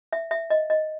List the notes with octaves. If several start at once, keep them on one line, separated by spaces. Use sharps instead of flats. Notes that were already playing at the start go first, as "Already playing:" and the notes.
E5
E5
D#5
D#5